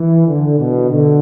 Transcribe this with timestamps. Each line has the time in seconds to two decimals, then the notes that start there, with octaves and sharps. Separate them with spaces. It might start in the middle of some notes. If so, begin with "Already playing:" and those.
Already playing: E3
0.26 D3
0.58 B2
0.90 D3